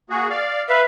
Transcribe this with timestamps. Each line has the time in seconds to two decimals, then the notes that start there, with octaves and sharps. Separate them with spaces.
0.10 A#3 F#4 G#4
0.30 D5 F5
0.68 B4 E5 F5